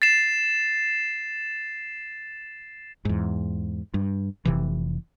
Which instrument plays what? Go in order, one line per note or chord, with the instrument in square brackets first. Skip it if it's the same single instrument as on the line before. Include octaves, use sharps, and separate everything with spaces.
[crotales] A6 C7 E7
[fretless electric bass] E2 G#2
G2
F1 C3 E3